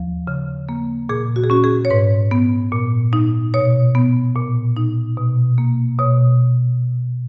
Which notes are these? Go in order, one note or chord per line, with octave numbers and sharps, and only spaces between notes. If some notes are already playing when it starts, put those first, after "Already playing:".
Already playing: D#2 F3
C#3
A#3
A#2 G#4
F#4
G#4
C#4 F#4
G#4
C#5
G#2 B4
B3
A#2
D#4
B2 C#5
B3
A#2
D#4
B2
A#3
B2 C#5